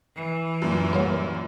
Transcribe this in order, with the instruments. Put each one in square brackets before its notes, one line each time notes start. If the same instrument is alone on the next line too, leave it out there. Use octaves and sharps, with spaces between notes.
[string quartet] E3
[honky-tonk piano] F#2 A#2
[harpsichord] G2 F#3 A#3